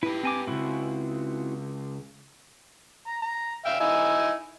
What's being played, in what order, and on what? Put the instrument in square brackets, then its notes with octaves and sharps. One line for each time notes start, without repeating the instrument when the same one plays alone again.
[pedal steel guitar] E4 [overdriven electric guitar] G4 B4
[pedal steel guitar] C4 G#5 D6
[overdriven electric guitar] C#2 G#2 [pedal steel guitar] C4 E4 F#4
[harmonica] A#5
A#5
E5 F5 G5
D#4 E4 G#5